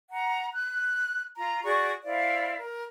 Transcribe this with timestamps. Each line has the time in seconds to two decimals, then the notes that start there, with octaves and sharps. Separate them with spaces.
0.11 F#5 A#5
0.54 F#6
1.38 F4 A#5
1.64 F#4 G#4 D5 C#6
2.04 E4 C5 D5 F5
2.57 A#4